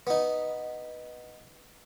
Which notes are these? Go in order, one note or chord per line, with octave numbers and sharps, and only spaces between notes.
B3 D#4